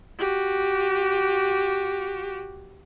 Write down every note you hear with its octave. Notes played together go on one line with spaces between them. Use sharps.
F#4 G4